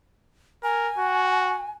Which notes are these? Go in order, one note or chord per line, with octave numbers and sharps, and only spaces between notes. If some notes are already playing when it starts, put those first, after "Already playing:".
A#4 G#5
F#4